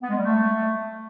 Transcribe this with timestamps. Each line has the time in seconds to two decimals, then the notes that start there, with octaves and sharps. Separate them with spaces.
0.02 B3
0.09 G#3
0.16 G3
0.23 A3